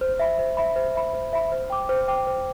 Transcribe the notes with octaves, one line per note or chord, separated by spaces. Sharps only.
C5
E5 B5
C5
E5 B5
C5
E5 B5
C5
E5 B5
C5
G5 D6
C5
G5 D6
C5